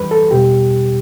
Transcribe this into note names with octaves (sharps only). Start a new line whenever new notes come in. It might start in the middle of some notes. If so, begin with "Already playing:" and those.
Already playing: F#2 E3 G3 B4
A4
E2 B2 G3 G4